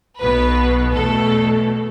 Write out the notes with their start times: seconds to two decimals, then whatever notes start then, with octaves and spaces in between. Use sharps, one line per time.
0.20 B1 B2 B3 B4
0.94 E2 B2 A3 A4